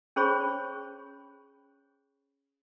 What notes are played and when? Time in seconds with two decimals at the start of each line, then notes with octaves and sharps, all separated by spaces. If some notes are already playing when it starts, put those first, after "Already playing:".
0.16 C#4 G#4 C5 C#5 B5 C#6